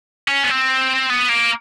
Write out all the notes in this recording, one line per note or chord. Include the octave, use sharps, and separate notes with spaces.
C#4
B3
C4
B3
A#3